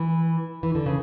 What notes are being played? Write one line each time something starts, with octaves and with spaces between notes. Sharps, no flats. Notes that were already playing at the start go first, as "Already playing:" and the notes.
Already playing: E3
E3
D3
C#3